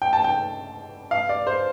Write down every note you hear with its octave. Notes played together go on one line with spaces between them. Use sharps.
G5
A5
G5
F5
D5
C5